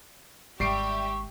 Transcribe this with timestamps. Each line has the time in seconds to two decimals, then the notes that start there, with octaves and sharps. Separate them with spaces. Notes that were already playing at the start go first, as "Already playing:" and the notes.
0.60 G#1 D#2 G3 G4 E5 C#6 C7 D7